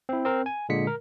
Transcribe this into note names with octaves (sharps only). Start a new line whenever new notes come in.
C4 E4
C4 A#4
G#5
A#2 D3 G#3 B6 C#7
A#4